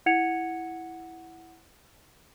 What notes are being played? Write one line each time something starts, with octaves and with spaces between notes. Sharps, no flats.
E4 F#5 G#6 C#7 F7